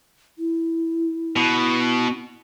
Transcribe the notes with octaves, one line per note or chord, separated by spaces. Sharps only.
E4
B2